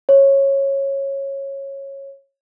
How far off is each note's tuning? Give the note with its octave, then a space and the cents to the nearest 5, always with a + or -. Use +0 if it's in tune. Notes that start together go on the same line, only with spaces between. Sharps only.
C#5 -15